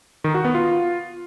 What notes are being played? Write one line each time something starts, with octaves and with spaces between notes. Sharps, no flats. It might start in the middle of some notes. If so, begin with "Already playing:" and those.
D#3
F#4
B3
F4